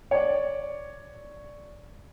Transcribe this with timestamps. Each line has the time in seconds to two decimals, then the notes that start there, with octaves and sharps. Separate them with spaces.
0.11 C#5 D5